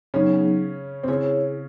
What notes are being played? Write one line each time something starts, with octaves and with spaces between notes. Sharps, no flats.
C#3 F#3 B3 C#4 D#4 G#4
C4
C#3 C#4 E4 G#4 C#5